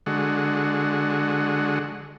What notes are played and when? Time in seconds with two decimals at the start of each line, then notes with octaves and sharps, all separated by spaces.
0.06 D3 G#3 F#4